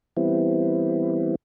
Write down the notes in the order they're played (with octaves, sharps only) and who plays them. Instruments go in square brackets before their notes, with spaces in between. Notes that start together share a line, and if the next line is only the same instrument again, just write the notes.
[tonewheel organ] E3 G3 B3 C4 E4